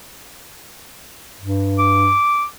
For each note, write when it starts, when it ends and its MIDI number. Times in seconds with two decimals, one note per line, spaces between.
1.40 2.14 43
1.79 2.45 86